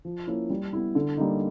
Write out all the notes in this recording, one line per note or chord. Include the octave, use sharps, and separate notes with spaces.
F3
A#3 C#4 E4
G3
B3 E4
D3
G3 A#3 D#4